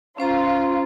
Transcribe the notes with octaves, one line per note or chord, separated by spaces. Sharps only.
C#4 F4 C5 A#5